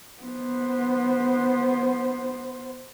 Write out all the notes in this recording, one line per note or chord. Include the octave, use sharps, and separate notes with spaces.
B3 C5